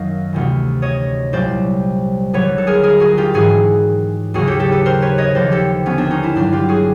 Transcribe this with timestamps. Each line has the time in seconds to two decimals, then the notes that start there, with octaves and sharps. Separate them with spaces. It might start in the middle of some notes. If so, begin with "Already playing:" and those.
Already playing: F#2 D#3 F#3 D#5 F5
0.33 D2 C3 E3
0.82 C#5 D#5
1.33 C2 A#2 F#3 C5 D5
2.33 D#2 D3 F#3 B4 C#5
2.58 A4
2.67 G#4 A#4
2.83 G#4 A#4
3.00 F#4 G#4
3.17 F4 G4
3.34 G#2 E3 F#4 G#4
4.34 D#2 C#3 F#3 F#4 G#4
4.47 G4 A4
4.59 G4 A4
4.72 A4 B4
4.86 A#4 C5
5.02 B4 C#5
5.18 C#5 D#5
5.35 D#2 D3 F3 C5 D5
5.52 G4 A4
5.86 B3 C#4
5.98 C4 D4
6.10 C#4 D#4
6.23 D4 E4
6.35 G2 D3 F#3 C4 D4
6.52 F4 G4
6.69 F#4 G#4